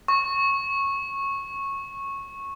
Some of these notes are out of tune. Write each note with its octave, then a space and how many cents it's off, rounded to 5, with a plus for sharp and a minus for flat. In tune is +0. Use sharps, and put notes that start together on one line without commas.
C#6 -15